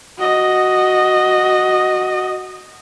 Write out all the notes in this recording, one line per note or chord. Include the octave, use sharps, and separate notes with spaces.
F#4 D#5